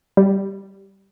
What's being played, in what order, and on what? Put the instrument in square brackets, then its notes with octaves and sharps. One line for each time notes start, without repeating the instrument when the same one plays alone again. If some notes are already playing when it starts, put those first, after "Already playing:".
[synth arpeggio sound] G3